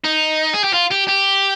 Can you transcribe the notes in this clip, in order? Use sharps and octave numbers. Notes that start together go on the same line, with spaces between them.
D#4
G#4
G4
F4
G4
G4